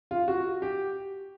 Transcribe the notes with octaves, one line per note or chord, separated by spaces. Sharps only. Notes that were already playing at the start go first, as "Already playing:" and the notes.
F4
F#4
G4